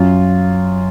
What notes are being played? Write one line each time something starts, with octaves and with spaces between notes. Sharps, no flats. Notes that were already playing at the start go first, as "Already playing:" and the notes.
Already playing: F#2 F4